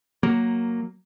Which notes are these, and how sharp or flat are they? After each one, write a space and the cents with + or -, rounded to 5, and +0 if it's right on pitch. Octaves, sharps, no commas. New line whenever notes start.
F#3 +0 A#3 +0